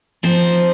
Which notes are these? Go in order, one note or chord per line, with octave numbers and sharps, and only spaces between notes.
F3 C4 D#4 C5